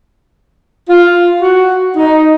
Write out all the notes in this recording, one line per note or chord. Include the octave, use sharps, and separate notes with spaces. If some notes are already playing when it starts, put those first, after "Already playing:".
F4
F#4
D#4